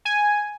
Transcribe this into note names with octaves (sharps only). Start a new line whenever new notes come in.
G#5